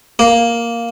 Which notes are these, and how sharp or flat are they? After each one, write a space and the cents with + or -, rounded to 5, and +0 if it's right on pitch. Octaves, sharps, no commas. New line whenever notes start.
A#3 +0